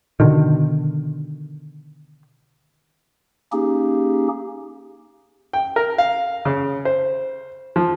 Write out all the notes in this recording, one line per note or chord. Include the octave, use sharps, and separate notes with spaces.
B2 D3 D#3
A#3 C#4 D#4 G4 G#4
G5
A#4
F5
C#3
C5
F3